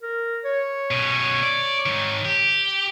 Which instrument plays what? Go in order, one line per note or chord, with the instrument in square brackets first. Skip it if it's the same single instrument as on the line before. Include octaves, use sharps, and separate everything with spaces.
[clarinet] A#4
C#5
[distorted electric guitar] B2 C#4
D5
G#2 D#3
G4